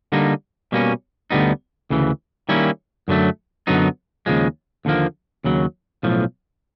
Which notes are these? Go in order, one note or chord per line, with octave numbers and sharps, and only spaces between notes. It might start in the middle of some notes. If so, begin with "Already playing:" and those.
D3 G3 A#3 D#4
B2 G3 A#3 C#4
D2 D3 G3 B3 D#4
D2 C#3 E3
D#3 G3 A#3 C#4 E4
F#2 D3 F#3 A3
F#2 D3 F#3 B3 D#4
D#2 C#3 F3 G#3
D#2 D3 F3 A#3
D#2 C#3 F#3
B1 A2 F3